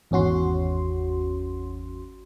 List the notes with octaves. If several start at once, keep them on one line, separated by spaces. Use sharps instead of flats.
G#1 E2 C#4 F#4 C6